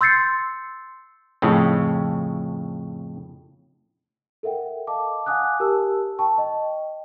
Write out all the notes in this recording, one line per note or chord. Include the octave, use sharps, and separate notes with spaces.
C6 E6 G6 A6 C7 C#7
F2 A2 C#3
A4 A#4 E5 F#5 G5
D#5 F5 A5 D6
F5 F#5 G#5 D6 D#6 F#6
G4 A#4 A5 E6
G5 A5 C#6
D#5 G5